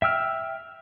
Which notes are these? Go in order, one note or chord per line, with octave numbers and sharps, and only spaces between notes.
E5 G5 E6 F6